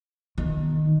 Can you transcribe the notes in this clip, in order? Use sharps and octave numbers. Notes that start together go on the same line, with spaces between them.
D#3